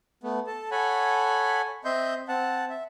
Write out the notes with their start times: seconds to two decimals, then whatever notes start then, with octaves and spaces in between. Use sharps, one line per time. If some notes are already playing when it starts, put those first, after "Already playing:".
0.24 A3 B3
0.47 A4 A5
0.71 A4 C#5 F#5 G#5 B5
1.85 C4 D#5 E5 C6 G6
2.28 C4 F#5 A5
2.70 E5